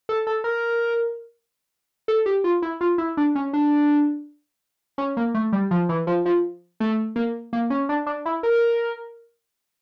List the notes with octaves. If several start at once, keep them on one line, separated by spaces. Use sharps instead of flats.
A4
A4
A#4
A4
G4
F4
E4
F4
E4
D4
C#4
D4
C#4
A#3
A3
G3
F3
E3
F3
F3
A3
A#3
A#3
C#4
D4
D4
E4
A#4